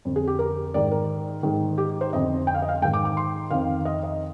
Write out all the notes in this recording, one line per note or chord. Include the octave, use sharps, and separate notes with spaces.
F2 D3
G#4
G4
A#4
G#2 D#3 D5
A#4
G#2 D#3
G4
C5
F2 D3 D#5
G5
F5
D#5
F5
G#2 D#3 G5
D6
D6
C6
F2 D#3 F5
D#5
D#5